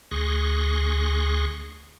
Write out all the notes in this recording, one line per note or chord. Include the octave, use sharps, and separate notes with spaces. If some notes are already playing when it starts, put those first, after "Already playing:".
D2 G#4 C6 C#6 F#6 A#6